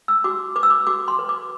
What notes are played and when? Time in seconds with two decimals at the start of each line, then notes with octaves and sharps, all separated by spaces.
0.08 E6
0.24 F#4 D6
0.56 B4 D6
0.63 E6
0.70 D6
0.87 F#4 D6
1.08 C6
1.19 B4
1.29 D6